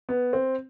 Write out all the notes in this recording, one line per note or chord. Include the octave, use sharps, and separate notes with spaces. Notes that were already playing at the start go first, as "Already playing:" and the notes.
B3
C4